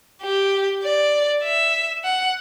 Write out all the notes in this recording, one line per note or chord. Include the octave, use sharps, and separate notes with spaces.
G4
D5
E5
F#5